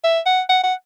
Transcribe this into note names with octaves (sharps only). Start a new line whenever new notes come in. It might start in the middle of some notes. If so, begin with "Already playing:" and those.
E5
F#5
F#5
F#5